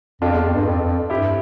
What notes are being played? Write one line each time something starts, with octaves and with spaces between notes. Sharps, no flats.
F2 D4 F4
E2
F2
G2
F2
F2
G2 E4 G4